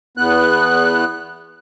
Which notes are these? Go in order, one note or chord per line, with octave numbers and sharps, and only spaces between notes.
E2 B3 F#6